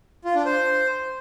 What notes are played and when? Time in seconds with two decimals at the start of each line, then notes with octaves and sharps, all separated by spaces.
0.25 F4
0.35 D4
0.46 C5